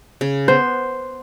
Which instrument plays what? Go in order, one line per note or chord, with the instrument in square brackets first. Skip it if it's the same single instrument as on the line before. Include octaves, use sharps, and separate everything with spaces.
[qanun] C#3
[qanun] B3 [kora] C5